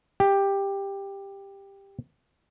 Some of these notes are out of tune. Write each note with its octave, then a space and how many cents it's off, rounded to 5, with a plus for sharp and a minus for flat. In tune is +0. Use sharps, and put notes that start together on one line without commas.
G4 +10